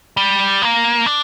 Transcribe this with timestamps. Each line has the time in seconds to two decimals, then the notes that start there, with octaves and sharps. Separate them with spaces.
0.17 G3
0.62 A#3
1.06 D4